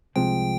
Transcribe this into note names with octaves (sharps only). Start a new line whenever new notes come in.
C2 C3 F3 G#3 C4 G5